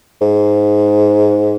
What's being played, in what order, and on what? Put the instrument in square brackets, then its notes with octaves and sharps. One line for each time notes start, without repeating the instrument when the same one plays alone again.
[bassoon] G#2